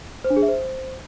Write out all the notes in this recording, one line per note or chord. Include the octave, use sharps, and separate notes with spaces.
C5
D4
G#4
E5
C5